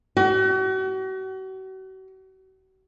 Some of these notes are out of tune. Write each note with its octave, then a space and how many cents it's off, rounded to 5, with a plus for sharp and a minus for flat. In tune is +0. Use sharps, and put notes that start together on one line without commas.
F#4 +40